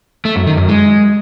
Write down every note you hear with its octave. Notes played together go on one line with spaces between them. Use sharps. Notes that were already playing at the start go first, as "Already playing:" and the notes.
A3
F#2
D#3
F#2
G#3